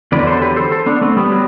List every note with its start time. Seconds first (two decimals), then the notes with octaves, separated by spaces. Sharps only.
0.12 E2 D3 F#3 B4 D5
0.27 A4 C5
0.41 G4 B4
0.56 A4 C5
0.72 A4 C5
0.86 B3 D4
1.02 A3 C4
1.17 G3 B3
1.32 F#3